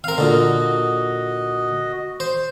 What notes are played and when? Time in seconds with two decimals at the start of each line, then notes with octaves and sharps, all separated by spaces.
0.04 C4 A#4 F5
0.18 A#2 D3 F#4 D#5
2.20 C5